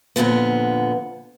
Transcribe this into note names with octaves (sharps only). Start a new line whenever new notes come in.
F2 A#2 D3 B3